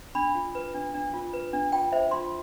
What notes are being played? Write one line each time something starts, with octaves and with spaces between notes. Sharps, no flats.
D4 B5
F4
B4
D4
D4
F4
B4
D4
F4 G5
C5 E5
F4 C6